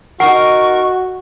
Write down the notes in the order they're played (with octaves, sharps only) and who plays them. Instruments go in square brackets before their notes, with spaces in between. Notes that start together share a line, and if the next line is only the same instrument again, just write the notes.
[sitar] D#4 A#4 [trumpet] F#4 [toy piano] F#5 [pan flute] C#6